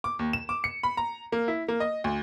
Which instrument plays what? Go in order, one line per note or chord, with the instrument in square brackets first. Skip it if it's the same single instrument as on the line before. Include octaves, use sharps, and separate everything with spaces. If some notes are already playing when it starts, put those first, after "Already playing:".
[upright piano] D6
D#2
E7
D6
C#7
B5
A#5
A#3
E4
A#3
D#5
D2